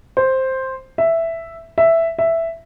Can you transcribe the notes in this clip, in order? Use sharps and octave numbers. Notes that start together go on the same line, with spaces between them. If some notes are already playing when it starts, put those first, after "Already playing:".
C5
E5
E5
E5